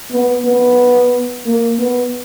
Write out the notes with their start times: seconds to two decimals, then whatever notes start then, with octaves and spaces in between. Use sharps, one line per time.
0.12 B3
0.45 B3
1.46 A#3
1.79 B3